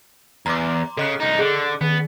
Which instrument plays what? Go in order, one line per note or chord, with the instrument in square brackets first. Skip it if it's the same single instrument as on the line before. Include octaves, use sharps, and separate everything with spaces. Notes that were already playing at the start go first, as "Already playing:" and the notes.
[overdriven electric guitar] E2 [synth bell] A#5 C6 D6
[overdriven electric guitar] C#3 [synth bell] A4 D#5 F#6
[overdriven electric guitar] C2 D#4
[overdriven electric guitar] D3 [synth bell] G#4
[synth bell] D#3 [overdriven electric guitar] B3